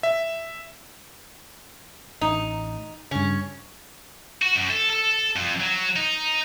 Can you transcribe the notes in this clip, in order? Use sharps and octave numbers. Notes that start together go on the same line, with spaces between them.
E5
A1 D#4
G2 C#3 C#4
F#4
F#2
A4
A4
F2
F#3
D#4